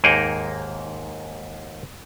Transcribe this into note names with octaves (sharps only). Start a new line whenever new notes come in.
D#2 G#2 A#3 D#4 G#4 G5